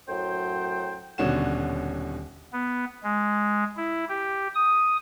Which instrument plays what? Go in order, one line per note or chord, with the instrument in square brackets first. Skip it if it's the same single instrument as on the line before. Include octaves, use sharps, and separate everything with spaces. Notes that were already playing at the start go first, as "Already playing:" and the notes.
[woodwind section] F#2 A2 F#3 C5 G5
[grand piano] D#1 B2 D3 C#4 F#4 E7
[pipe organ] B3
G#3
E4
G4
D#6